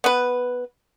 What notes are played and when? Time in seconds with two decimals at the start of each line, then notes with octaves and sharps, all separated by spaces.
0.04 B3 B4